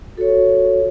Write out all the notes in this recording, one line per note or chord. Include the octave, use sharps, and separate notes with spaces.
F#4 A4 C#5